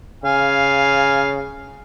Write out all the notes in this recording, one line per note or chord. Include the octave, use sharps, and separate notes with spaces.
C#3 F5 G#5